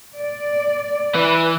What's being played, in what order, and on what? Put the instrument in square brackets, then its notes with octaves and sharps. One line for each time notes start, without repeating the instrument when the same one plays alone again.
[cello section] D5
[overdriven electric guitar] E3 [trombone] B4